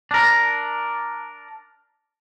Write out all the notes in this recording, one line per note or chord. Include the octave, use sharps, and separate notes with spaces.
D4 A#4